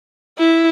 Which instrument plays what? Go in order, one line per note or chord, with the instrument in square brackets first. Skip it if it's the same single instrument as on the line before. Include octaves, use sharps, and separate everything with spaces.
[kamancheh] E4